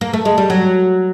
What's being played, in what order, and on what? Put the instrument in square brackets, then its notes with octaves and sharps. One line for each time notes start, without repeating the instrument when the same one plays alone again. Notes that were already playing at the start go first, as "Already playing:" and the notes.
[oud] A#3
A3
G#3
G3
F#3